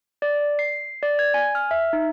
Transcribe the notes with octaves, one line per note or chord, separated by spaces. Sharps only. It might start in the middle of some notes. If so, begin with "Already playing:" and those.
D5
C7
D5
G#6
G#5
F6
E5
D#4